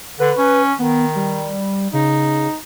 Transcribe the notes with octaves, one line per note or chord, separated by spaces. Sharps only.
D3 B4
C#4
D#3 B3
G3
C#3 D#4